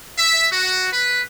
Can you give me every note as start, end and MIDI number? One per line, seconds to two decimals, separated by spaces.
0.16 0.45 76
0.51 0.87 66
0.91 1.20 71